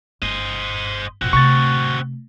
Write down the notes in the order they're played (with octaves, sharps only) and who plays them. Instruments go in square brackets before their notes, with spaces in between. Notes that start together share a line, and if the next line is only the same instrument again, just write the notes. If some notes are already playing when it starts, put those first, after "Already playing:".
[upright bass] G1 [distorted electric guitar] C5 D#5
[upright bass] F2 A#2 [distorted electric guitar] C4 F#4
[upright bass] C3 A3 [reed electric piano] C#6 A6